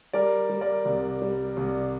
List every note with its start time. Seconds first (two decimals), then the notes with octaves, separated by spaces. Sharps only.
0.13 G3 A#4 D5
0.49 G3
0.61 A#4 D5
0.85 C2
1.22 G3
1.57 C2